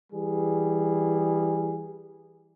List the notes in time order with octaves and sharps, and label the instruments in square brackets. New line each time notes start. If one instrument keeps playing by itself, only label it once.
[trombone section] E3 G3 G#4